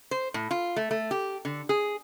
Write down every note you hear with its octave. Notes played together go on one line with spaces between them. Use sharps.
C5
A2
F4
A3
A3
G4
D3
G#4